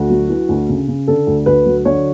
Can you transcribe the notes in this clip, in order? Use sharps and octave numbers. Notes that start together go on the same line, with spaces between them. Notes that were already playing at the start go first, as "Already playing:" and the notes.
Already playing: D2 F#4
F#3
E3
D2
C#3
C#3
D3 A4
D2
D2 B4
F#3
D3 C#5